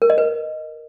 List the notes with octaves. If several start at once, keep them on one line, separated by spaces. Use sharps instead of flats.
A#4
D#5
B4